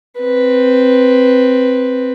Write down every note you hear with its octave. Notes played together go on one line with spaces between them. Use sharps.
C4 B4